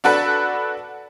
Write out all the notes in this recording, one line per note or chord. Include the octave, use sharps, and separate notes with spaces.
D4 F#4 A4 B4